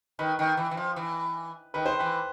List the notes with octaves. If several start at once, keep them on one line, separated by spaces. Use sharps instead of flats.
D#3 B4
D#3
E3
E3
F3
E3
D#3 B4
C5
E3 B4